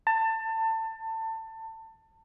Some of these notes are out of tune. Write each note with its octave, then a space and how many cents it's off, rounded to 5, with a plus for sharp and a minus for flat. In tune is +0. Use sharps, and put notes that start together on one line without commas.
A5 +25